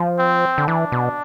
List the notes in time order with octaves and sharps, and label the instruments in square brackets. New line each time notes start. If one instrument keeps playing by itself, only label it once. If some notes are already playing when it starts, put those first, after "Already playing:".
Already playing: [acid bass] F3
[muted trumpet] C4
[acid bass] D3
[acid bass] E3 [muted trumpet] D4
[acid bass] B2